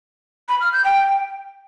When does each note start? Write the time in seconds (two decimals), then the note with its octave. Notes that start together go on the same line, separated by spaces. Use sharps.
0.48 B5
0.60 F6
0.72 G6
0.84 G5